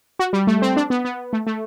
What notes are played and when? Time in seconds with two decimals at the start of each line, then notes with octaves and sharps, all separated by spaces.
0.19 F#4
0.33 G3
0.47 A3
0.62 C4
0.76 D4
0.90 B3
1.05 B3
1.33 A3
1.47 A3